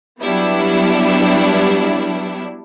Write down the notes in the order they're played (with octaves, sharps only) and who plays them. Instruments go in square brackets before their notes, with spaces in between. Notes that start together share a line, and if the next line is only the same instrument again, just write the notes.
[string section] F#3 G3 B3 D4 E4